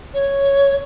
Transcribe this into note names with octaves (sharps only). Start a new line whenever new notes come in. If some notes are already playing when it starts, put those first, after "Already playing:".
C#5